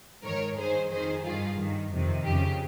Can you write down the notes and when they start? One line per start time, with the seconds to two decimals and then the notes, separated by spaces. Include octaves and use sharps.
0.24 G#2 D#3 A#4 C#5
0.58 G2 D#3 G#4 C5
0.91 F2 D#3 G#4 C5
1.24 G2 D#3 F4 G#4
1.58 G2 D#3
1.92 F2 C3 D#3
2.25 F2 C#3 G4